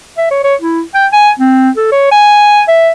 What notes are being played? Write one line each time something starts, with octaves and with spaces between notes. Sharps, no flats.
E5
C#5
C#5
E4
G5
G#5
C4
A4
C#5
G#5
E5